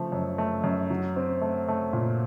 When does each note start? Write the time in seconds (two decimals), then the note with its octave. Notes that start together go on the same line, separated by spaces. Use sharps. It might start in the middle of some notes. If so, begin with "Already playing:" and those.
Already playing: C#3 F3 A3
0.12 F#2
0.38 A3
0.64 F#2
0.90 F#3
1.16 C4
1.42 A3
1.68 A3
1.93 A#2